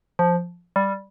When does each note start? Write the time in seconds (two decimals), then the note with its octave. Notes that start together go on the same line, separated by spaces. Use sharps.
0.19 F3
0.76 G3